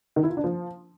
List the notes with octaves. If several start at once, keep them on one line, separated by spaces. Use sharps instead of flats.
D#3
E4
F4
D4
F3